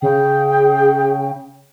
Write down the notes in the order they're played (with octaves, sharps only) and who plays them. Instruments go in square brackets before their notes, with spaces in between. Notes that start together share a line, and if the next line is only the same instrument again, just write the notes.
[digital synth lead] C#3 [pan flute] G#4 [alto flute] G5